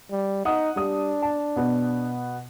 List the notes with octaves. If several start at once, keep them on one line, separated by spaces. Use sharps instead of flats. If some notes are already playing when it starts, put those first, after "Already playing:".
G3
D#4 F#5 D#6
G3 D4 D#6
A5
B2 B3